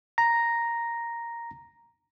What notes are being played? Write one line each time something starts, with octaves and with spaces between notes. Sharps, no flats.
A#5 A#6